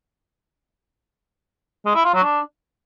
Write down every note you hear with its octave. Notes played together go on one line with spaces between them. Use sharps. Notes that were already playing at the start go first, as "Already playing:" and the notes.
G#3
E4
F4
F#3
D4